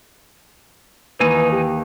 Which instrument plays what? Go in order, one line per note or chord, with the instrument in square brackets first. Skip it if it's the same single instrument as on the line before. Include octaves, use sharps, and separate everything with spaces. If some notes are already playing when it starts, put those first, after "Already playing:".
[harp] D#2 [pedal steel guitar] E3 D#4 G#5 [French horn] B4
[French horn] G4